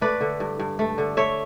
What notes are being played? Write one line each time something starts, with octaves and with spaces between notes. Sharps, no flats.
A3 B4 D5
D3
G2
G2
A3
D3
A3 C#5 E5